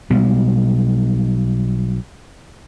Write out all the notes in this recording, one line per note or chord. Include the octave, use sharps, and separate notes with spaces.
B1 B2 G3 G#3